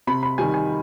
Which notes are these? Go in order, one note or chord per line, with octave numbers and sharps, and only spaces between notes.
C3 B5
B5
D#3 G3 G#5
G#5